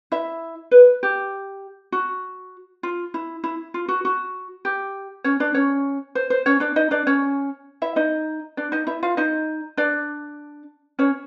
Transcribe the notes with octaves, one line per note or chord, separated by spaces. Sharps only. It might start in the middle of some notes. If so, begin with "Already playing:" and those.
E4 E5
B4
G4
F#4
F4
E4
E4
F4
F#4
F#4
G4
C#4 C#5
D4 D5
C#4 C#5
C5
C5
C#4 C#5
D4 D5
D#4 D#5
D4 D5
C#4 C#5
E4 E5
D#4 D#5
D4 D5
D#4 D#5
E4 E5
F4 F5
D#4 D#5
D4 D5
C#4 C#5